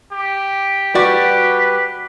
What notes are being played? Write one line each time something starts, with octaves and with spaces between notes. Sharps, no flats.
G4
G3 F#4 B4 D5